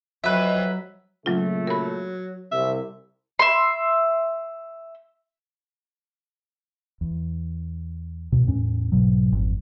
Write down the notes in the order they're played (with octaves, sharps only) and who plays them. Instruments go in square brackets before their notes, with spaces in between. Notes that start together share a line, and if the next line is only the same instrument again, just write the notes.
[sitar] F2 [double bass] F#3 [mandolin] B4 E5
[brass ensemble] A#2 C#3 A3 [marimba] F#3 F4
[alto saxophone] F#3 [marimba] A#4 B5
[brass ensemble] C2 [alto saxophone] E5
[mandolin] E5 C6
[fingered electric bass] E2
E2 B2
E2 A2 C#4
B1 G#2 B2 F#3
G#1 F2